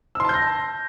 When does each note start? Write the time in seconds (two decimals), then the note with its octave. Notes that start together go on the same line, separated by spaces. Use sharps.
0.15 E6
0.20 C6
0.25 A5
0.29 G6
0.34 A#6